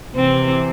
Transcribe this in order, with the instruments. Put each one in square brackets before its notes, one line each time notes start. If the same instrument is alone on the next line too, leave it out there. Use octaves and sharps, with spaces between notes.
[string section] C3 E3 [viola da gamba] C4